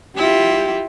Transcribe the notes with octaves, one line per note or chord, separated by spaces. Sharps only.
E4 F4 G4